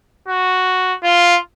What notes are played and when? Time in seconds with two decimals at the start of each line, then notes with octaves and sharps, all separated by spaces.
0.28 F#4
1.03 F4